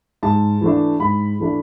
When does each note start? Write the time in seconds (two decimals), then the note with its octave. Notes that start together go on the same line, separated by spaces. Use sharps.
0.23 G#2 A5
0.61 E3 A3 D4
1.00 G#2 B5
1.39 E3 A3 D4